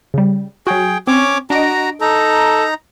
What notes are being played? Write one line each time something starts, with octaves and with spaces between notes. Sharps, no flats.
C#3 G3
F#3 F#4 G#4 G5
C4 C#4 C#5 D6
D4 F#4 D#5 A#5 D7
D#4 A4 A#5